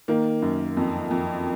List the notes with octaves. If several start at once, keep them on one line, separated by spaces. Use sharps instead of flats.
D#3 A#3
F#2
F2
F2